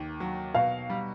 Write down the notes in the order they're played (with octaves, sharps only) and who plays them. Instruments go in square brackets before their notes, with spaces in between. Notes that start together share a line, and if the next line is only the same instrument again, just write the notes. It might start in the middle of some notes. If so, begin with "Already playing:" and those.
Already playing: [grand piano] D#2 A#3
F#3
[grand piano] B2 [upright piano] F5
[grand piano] G3